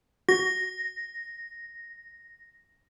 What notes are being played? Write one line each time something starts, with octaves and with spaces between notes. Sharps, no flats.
F#4 A#6